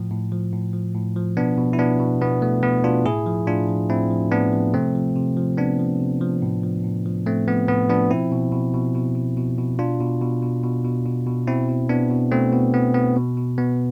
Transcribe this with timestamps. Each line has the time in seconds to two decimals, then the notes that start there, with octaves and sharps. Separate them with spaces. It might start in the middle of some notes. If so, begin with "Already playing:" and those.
Already playing: A2 F3
0.11 A2
0.32 F3
0.53 A2
0.73 F3
0.95 A2
1.16 F3
1.37 B2 B3 D4
1.58 B2
1.73 E4
1.79 B2 B3 D4
2.00 B2
2.21 B2 B3
2.42 B2 A3
2.63 B2 B3
2.84 B2 D4 F4
3.05 A2 E4 G#4
3.26 F3
3.47 A2 D4 F4
3.69 F3
3.89 A2 C4 E4
4.11 F3
4.32 A2 B3 D4
4.53 F3
4.74 C3 A3 C4
4.95 F3
5.16 C3
5.37 F3
5.58 C3 B3 D4
5.79 F3
6.00 C3
6.21 F3
6.42 A2
6.63 F3
6.84 A2
7.06 F3
7.26 A2 A3 C4
7.48 F3 B3
7.69 A2 B3
7.89 F3 B3 D4
8.11 B2 C4 E4
8.32 B2
8.52 B2
8.74 B2
8.95 B2
9.15 B2
9.37 B2
9.58 B2
9.79 B2 D4 F4
10.00 B2
10.21 B2
10.42 B2
10.63 B2
10.84 B2
11.05 B2
11.26 B2
11.47 B2 C4 E4
11.69 B2
11.89 B2 B3 D4
12.10 B2
12.32 B2 A3 C4
12.53 B2 B3
12.74 B2 B3
12.95 B2 B3
13.16 B2
13.37 B2
13.58 B2 B3